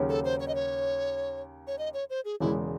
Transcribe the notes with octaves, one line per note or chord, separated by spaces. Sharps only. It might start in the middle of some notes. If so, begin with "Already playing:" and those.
Already playing: D#2 C#3 F#3 C#4
A4
C5
C#5
D#5
C#5
C#5
D#5
C#5
C5
G#4
E1 E2 C#3 G#3 E4